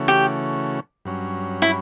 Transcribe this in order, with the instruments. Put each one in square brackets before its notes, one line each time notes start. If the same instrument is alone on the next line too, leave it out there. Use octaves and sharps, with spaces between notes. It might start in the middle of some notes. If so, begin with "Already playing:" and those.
Already playing: [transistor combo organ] C#3 E3 A3 C#4 F#4
[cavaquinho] G4
[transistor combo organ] G2 F#3 C#4
[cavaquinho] E4